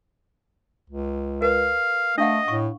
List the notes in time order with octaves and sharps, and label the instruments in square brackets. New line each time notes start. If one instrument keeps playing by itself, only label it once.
[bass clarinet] C#2
[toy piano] A#4 B4 [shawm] F5
[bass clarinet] A3 [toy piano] D4 F5 F#5 [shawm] D#5
[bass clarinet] A2 [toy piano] C#6